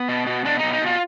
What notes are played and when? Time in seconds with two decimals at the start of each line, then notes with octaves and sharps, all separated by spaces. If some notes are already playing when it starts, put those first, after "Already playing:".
Already playing: B3
0.09 B2
0.27 B2
0.45 B2 D4
0.59 B2 D#4
0.73 D#4
0.82 B2 F4